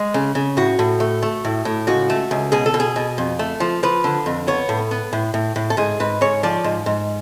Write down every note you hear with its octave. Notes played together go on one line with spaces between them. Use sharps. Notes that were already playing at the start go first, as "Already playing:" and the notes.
Already playing: G#3
C#3
C#3
A2 F#4
A2
A3
A3
A2
A2
C#2 F#4
A3
C#2
B2 G#4
A4
B2
G#4
B2
F2
A3
F3
F3 B4
D3
F2
B3 C#5
A2
B3
A2
A2
A2
A4
G#2 G#4
G#2 B4
G#2 C#5
F3 D5
G#2
G#2